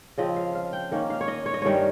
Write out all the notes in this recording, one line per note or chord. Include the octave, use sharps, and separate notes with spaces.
C#3 F3 C4 D#5
F5
F5
G5
D#3 A#3 C#4
F5
C#5
D#5
C#5
D#5
G2 D#3 G3 C#4 C#5